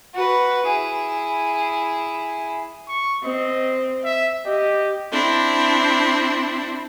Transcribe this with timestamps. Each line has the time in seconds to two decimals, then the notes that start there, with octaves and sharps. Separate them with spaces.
0.14 F#4 B4
0.66 E4 G#4
2.88 C#6
3.25 C4 D#5
4.05 E5
4.46 G4 D#5
5.11 C4 D4 E4